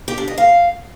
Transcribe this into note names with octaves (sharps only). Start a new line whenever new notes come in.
G4
D4
D#5
F5